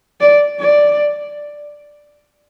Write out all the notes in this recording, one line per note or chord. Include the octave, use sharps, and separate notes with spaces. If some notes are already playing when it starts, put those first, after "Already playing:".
D5
D5